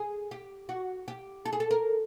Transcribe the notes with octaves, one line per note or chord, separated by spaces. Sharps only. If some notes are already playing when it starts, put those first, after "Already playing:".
Already playing: G#4
G4
F#4
G4
A4
G#4
A4
A#4